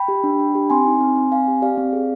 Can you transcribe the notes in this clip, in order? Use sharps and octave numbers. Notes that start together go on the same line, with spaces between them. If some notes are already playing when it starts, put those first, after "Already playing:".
Already playing: G5 B5
G4
D4
D4
G4
C4 G#5 C6
D#4
C4
C4
C4 F5 G#5
G4
G4 D5 F5
C4
G#4